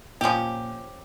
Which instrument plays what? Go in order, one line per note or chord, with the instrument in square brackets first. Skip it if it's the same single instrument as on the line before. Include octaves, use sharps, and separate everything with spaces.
[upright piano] A#2 [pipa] F3 C#4 G4